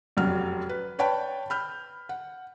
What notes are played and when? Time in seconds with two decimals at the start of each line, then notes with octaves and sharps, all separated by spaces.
0.17 F1 F#2 F#3 F6
0.69 B4
0.99 B4 C#5 D5 G5 A5 B5
1.50 B5 F6 G6
2.09 F#5